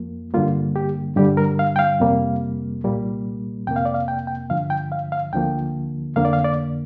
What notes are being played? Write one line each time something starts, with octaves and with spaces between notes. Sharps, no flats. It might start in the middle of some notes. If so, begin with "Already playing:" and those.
Already playing: F2 F3 A#3
G2 D3 G3 A#3 F4
G4
G2 D3 G3 G4
A#4
F5
G5
F5
F2 C3 G3 A#3
C2 A#2 G3 A#3
F2 C3 A#3 G5
F5
D5
F5
G5
G5
G2 D3 F3 F5
G5
F5
F5
D2 D3 F3 A#3 G5
F2 D3 A#3 F5
D5
F5
D5